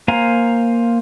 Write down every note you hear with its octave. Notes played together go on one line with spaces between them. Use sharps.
A#3 C5 F5 G#5 A#5